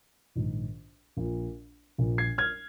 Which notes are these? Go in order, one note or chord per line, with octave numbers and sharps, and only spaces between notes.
A#1 G#2 D#3
A#1 A#2
A#1 A#2
G#6 C7
F6 G#6